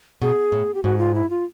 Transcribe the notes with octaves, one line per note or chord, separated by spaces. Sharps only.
B2 G#4
A2
G4
G#2 F#4
F4
E4
F4